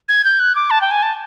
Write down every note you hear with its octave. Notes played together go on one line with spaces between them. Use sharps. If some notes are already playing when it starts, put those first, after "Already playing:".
G#6
G6
F#6
D6
A5
G5
G#5
A5